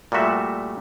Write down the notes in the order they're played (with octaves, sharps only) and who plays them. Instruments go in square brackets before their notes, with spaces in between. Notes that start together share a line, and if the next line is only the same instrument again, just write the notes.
[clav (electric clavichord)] A#2 G3 A3 F#4 E5